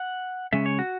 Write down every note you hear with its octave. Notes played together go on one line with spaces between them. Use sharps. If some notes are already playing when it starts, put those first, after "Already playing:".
Already playing: F#5
C#3 G#3 C#4 E5
C#5
F#4